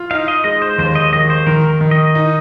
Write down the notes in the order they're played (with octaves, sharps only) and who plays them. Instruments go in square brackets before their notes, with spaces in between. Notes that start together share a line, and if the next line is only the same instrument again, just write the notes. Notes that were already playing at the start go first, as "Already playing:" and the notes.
Already playing: [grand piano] F4
[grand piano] D#4 [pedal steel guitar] F5
[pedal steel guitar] D#5
[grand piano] G#3 [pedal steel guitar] D#5
[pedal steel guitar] C5
[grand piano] D#2 [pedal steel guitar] C5
[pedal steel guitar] D#5
[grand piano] D#3 [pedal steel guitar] D#5
[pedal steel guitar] C5
[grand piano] D#3 [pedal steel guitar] A#4
[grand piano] D#3
[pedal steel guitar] D#5
[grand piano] D#4